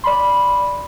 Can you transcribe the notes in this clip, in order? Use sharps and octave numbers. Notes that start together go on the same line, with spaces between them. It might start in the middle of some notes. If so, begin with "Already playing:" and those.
D5 B5 C6